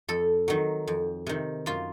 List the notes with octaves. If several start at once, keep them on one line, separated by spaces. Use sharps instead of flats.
F2 A4
D#3 F#3
F2
C3 D#3
F#2 F4